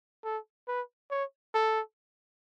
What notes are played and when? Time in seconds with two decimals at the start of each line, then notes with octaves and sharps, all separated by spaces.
0.25 A4
0.68 B4
1.11 C#5
1.54 A4